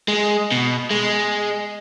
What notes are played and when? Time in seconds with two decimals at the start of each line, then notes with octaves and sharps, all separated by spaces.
0.08 G#3
0.51 B2
0.90 G#3